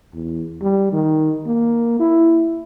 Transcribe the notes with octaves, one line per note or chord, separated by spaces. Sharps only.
E2
G3
D#3
A#3
E4